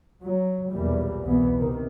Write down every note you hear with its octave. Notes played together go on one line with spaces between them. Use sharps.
F#3
B1 E2 A#2 E3 G3
C2 B2 E3 B3
C3 D#3